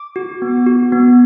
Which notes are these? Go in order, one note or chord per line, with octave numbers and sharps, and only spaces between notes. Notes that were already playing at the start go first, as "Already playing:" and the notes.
Already playing: D6
F#4
B3
F#4
B3